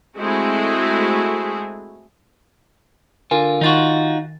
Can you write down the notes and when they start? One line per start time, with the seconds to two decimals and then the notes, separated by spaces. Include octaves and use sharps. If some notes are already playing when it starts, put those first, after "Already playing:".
0.17 G#3 A3 C4 E4 F#4 G#4
3.31 D3 F4 A#4 G#5
3.61 D#3 D#4 F4 F#4 A6